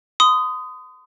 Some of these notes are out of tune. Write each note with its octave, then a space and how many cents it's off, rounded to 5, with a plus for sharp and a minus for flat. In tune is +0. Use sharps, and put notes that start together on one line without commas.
C6 -40 D#6 +0